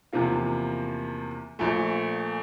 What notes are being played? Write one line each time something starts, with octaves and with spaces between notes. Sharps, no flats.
E2 C3 F3 A#3 F4
A#1 A#2 A3